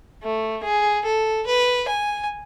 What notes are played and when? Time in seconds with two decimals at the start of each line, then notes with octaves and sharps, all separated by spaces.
0.23 A3
0.64 G#4
1.05 A4
1.46 B4
1.88 G#5